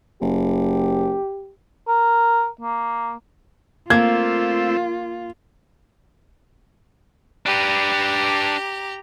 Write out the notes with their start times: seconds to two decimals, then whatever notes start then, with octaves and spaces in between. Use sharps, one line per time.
0.22 F#1 G4
1.88 A#4
2.61 A#3
3.90 A3 A#3 C4 F4 E6 G#6
7.46 D4 G4 B4 A#5